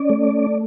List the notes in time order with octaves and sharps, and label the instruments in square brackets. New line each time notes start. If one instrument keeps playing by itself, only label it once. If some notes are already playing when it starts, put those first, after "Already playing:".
Already playing: [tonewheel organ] C#4 D5
A3